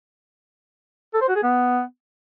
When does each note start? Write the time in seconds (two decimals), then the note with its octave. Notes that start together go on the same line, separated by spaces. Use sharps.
1.14 A4
1.21 C5
1.29 F#4
1.36 G#4
1.43 B3